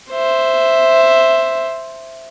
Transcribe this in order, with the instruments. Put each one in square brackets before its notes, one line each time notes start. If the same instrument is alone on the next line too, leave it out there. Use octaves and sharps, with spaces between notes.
[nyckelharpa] C5 E5